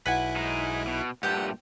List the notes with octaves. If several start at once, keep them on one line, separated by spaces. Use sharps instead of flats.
B1 E4 B4 F#5 G#5
G#3 D#4
B2
G2 A#2 A3 G4 F#5 G5